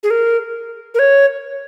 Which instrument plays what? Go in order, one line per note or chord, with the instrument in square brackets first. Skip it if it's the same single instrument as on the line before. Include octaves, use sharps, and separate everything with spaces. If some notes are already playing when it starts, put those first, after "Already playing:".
[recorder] G#4
A#4
A#4
C#5